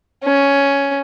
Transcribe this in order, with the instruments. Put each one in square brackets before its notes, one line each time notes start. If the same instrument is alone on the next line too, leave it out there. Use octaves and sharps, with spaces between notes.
[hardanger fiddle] C#4